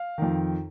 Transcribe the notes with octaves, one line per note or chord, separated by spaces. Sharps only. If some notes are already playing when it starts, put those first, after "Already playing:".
Already playing: F5
F2 D#3